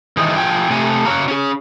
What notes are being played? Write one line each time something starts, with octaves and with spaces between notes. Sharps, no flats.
D#3 E3 D#4 G#4
F3 G5 G#5
C3 A3 A4 G#5
C#3 F#4 C#5 F5 A#5
C#4 G#4